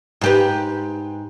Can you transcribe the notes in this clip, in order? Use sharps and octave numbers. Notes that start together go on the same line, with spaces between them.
G#2 G4 B4